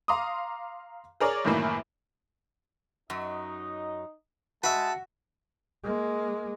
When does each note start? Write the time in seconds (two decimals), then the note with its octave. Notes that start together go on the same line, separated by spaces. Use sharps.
0.08 F5 A#5 C6 D6 D#6
1.20 G#4 A#4 C#5 D5
1.45 F#2 A2 D#3 E3 A#3 E4
3.10 F#2 F#3 D#4 D#5
4.64 G#3 F#4 B4 E5 A5
5.84 G#3 A#3